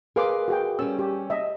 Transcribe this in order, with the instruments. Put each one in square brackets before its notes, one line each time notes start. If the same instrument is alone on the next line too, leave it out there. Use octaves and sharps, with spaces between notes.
[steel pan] G#4 C6 D6 [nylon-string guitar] A#4 B4 F5
[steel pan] F#4 G#4 G5
[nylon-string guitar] G3 C#4 [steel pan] E6
[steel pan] G4
D#5 E5